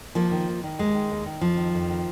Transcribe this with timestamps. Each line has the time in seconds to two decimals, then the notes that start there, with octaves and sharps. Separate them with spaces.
0.15 D#2 F3 A#3
0.31 D#3
0.47 D#2
0.64 D#3
0.79 D#2 G#3
0.95 D#3
1.10 D#2
1.26 D#3
1.41 F2 F3
1.57 D#3
1.74 F2
1.90 D#3